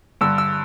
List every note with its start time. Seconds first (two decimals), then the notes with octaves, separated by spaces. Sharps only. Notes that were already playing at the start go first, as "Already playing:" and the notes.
0.21 G2 D3 E6
0.38 E6